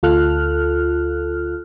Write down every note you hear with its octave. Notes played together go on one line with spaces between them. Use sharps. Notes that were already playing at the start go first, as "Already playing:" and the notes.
D2 F4 A4 F6 F#6